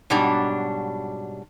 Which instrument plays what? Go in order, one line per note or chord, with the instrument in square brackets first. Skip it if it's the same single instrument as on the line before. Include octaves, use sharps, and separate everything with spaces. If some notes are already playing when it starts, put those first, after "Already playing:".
[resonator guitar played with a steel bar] G#2 B2 F#3 G3 D4